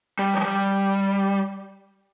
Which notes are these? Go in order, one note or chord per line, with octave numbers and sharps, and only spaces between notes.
G3
F3
G3